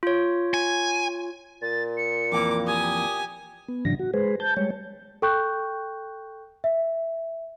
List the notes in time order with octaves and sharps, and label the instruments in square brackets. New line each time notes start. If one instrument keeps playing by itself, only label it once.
[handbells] F4 C#5
[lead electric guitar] G#5
[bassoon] A#2 [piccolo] A6
[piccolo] C#7
[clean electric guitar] F2 E3 A#3 [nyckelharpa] D6
[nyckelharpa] G4 G#5 [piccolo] D#6
[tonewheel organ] B3
G#2 C#3 E3 F#3 D4 A#6
F#4
G#3 G#4 B4 C5
A5 G6
G3 G#3 C#5
[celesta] A4 G5 C#6 F#6 G6
E5